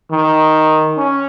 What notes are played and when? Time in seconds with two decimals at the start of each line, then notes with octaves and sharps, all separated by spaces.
0.11 D#3
0.98 C#4